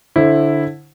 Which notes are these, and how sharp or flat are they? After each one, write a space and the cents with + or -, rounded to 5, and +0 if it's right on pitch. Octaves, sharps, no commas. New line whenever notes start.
D3 +0 E4 +0 C5 +25